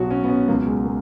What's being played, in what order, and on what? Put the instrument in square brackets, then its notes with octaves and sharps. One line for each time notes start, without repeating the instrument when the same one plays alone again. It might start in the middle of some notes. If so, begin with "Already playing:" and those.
Already playing: [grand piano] B1 B2 F#3 F#4
C#4
B3
C#4
C#2 B2 F#3 A#3
G#3
A#3